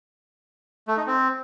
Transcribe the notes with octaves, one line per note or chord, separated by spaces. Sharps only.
A3
D#4
C4